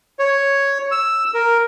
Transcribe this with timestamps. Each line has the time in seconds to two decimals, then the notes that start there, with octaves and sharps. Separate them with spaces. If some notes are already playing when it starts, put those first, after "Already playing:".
0.19 C#5
0.92 E6
1.34 A#4